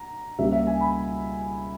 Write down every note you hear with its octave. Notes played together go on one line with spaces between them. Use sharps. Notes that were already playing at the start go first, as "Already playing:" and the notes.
Already playing: A#5
C#2 C#3 G3 A#3 E5
E5
G#5
B5